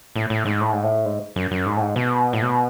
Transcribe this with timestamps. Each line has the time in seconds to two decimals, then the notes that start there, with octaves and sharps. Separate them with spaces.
0.16 A2
0.30 A2
0.45 G#2
0.61 A2
0.73 G#2
0.84 A2
1.05 G#2
1.36 F#2
1.51 F#2
1.66 G#2
1.77 A2
1.81 G#2
1.96 B2
2.33 A2
2.42 B2